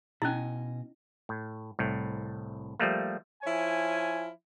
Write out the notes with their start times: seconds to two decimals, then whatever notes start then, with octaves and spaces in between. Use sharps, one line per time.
0.22 B2 C#4 D#4 E4 D#5 G#5
1.29 A2
1.79 C2 A2
2.80 F3 G3 A3 A#3
3.43 F3 E4 C#5 G#5